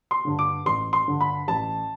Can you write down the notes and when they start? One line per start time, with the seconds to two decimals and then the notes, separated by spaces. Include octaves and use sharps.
0.11 C6
0.25 G2 D3
0.39 D6
0.66 A1 C6
0.93 C6
1.07 G2 D3
1.21 B5
1.48 A1 A5